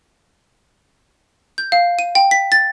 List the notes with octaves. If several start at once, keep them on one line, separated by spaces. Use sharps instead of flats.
G6
F5
D#7
G5
B6
A6